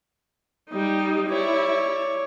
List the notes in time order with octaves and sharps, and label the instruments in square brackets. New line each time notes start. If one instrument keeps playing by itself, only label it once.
[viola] G3 D#4
[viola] E4 [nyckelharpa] C#5 D5